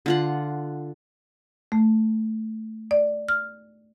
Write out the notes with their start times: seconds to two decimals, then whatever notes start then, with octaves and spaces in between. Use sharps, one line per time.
0.06 D3 F4 F#5
1.72 A3
2.91 D5
3.29 F6